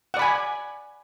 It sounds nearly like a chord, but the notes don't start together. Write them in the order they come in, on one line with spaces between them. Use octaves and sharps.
F#5 D5 B5 G#5